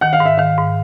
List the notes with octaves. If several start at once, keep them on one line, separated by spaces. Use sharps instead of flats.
D#3 F#5
F5
G#2
E5
D#3 F5
G#2